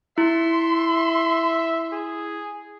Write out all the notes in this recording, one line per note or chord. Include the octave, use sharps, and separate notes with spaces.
E4 E5 C6
G#4